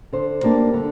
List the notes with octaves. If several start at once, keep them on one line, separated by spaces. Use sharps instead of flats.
D3 C5
G3 A#3 D4
D3